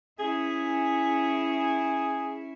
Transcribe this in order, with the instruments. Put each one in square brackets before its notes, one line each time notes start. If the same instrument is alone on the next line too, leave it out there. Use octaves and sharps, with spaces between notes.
[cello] C#4 E4 [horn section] G#4